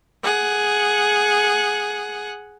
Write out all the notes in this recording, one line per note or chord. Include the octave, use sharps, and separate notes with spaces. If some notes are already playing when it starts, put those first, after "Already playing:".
G#4 F#5